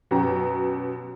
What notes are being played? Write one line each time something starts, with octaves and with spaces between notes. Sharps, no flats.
F#2 B2 G4 A#5